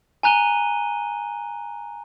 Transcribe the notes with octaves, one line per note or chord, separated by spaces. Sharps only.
G#5 A#5 F#6 D#7 G7